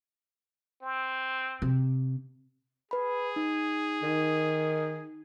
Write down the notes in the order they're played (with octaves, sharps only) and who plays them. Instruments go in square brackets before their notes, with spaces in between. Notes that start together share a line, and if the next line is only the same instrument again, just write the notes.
[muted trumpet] C4
[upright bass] C3
[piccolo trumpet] G#4 [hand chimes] B4 B5
[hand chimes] D#4
[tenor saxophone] D#3